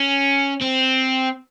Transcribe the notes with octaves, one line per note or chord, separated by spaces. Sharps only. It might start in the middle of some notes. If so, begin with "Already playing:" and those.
Already playing: C#4
C4